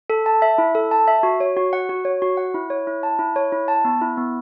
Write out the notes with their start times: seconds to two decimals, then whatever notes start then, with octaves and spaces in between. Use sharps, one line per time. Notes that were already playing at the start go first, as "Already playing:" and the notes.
0.10 A4
0.26 A5
0.42 E5
0.58 E4
0.75 A4
0.91 A5
1.08 E5
1.23 F#4
1.40 C#5
1.57 F#4
1.73 F#5
1.89 F#4
2.05 C#5
2.22 F#4
2.37 F#5
2.54 E4
2.70 C#5
2.87 E4
3.03 A5
3.19 E4
3.36 C#5
3.52 E4
3.68 A5
3.85 B3
4.01 E4
4.17 B3